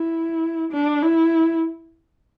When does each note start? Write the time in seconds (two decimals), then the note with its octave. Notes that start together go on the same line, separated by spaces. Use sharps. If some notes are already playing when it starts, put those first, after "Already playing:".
Already playing: E4
0.72 D4
1.02 E4